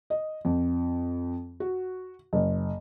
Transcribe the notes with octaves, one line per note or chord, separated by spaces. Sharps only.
D#5
F2
F#4
F#1